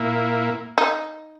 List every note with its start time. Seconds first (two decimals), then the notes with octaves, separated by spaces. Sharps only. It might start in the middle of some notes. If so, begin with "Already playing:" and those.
Already playing: A#2 A#3 E4
0.78 D#4